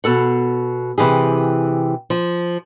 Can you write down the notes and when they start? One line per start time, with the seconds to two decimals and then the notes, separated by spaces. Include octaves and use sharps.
0.04 B2 A4 F#5
0.98 C3 E3 G4 G#4
2.10 F3